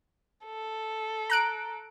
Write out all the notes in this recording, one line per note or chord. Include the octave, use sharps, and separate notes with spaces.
A4
A#5 F#6 D7